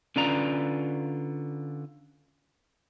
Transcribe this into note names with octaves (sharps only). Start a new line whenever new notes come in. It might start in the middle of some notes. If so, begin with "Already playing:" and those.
D3 C#4 F4 B4 D5 A#5